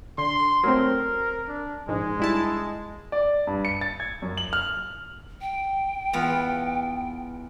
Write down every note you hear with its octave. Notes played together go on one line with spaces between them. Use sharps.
D3 C6
F#3 A3 C4 A#4
D4
A#1 G#2 G#3
G2 E4 A5
D5
G2
C#7
A6
G#6
F#2
F#7
F6
G5
E2 B3 F4